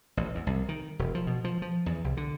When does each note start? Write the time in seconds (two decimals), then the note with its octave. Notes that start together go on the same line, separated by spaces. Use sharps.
0.17 A1
0.35 E2
0.47 C2
0.69 D#3
0.99 E1
1.15 F3
1.27 B2
1.44 F3
1.62 F3
1.86 E2
2.04 C2
2.17 D3